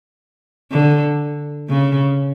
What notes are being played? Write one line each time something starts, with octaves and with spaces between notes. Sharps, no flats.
D3
C#3